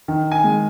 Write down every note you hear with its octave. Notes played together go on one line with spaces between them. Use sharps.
D#3
G#5
G#3